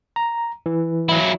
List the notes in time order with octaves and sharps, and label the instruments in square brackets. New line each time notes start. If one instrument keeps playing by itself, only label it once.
[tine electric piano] A#5
E3
[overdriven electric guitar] F#3 E4